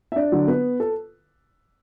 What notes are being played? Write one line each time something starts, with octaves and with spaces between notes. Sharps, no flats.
E5
D4 D5
D3 F#3
B3 B4
A4